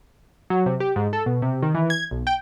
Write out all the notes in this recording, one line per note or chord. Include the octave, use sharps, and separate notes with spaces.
F#3
C3
G4
G#2
A4
B2
C3
D#3
E3
G#6
B1
G5